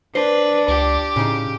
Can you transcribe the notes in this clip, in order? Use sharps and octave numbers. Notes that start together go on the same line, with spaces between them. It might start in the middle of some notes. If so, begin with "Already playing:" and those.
D4 B4 C5
C#2 G4
A2 C#3 D#4